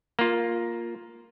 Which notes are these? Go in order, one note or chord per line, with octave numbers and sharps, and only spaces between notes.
A#3 F4